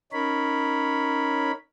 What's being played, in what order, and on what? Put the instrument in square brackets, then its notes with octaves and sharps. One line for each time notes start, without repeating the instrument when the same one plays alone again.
[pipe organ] C#4 D#4 A#4 C#5 B5